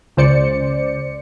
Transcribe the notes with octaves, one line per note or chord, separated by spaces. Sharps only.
C#2 C#3 C5 D5 C#7